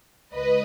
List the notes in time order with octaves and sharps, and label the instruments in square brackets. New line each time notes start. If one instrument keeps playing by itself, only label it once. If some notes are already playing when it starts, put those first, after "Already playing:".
[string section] C#2 B4 D#5